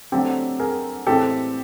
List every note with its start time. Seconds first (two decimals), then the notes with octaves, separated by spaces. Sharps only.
0.12 D3 F#3 A3 C4 G4 A4
0.60 G#4 A#4
1.07 A2 E3 G#3 C4 G4 A4